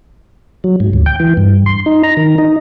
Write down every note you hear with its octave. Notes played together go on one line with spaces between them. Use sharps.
F#3
G#2
D2
G5
E3
G2
C6
D#4
A#5
D#3
D#4